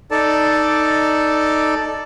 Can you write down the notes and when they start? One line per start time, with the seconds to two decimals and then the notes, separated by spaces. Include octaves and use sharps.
0.11 D#4 A4 D5 A5